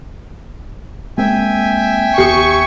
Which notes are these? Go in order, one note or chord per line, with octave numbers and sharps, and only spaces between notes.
G#3 A#3 C4 E5 G5 G#5
D#2 B3 G4 C#6 D#6